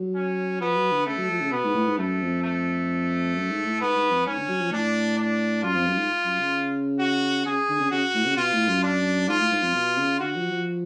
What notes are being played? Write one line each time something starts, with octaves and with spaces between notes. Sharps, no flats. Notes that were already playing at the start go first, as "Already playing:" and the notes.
Already playing: F#3
C#4
F3 B3
F#3
D3
C#3 A3
F#3
F3
C#3
B2 B3
G#2
A2
G#2
F#2 A3
F2
A3
F#2
G#2
A2
G#2 B3
G#2
F2
G#2 C#4
D3
F#3
F3
A2 D4
D4
F#2 F4
F2
F#2
G#2
F#2
C#3
F#4
C#3 G#4
D3
C#3
C#3 F#4
A2
C#3
B2 F4
A2
F#2
D4
G#2 F4
A2
G#2
F2
B2
C#3
D3 F#4
F3
F3